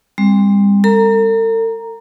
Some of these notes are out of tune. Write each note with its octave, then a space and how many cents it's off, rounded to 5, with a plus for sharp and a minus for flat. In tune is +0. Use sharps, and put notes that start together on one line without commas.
G3 +40 C4 +0
A4 +45 A#5 +0